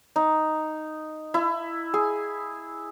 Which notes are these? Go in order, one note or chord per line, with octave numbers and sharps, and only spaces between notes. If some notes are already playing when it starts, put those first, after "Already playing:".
D#4
E4
G#4